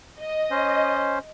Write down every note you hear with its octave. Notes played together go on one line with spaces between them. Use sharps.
D#5
C#4 C5